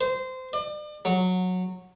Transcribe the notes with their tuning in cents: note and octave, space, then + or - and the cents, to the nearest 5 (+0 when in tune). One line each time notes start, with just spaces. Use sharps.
C5 -20
D5 +40
F#3 -15